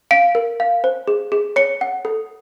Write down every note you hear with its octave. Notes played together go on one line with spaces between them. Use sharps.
F5 D7
A#4
F5
C5
G#4
G#4
C#5 C#7
F#5
A4